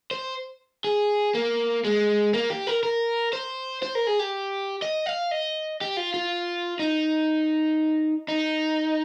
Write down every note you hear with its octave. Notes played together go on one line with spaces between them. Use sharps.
C5
G#4
A#3
G#3
A#3
G4
A#4
A#4
C5
C5
A#4
G#4
G4
D#5
F5
D#5
G4
F4
F4
D#4
D#4